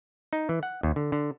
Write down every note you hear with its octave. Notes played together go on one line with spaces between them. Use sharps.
D#4
E3
F#5
D#2
D3
D3